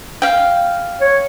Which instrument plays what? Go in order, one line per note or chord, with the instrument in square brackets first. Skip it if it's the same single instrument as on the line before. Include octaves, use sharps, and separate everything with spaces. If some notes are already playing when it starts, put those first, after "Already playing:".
[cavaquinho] F5 G5
[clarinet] C#5